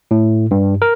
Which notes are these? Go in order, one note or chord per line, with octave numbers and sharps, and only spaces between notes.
A2
G2
A#4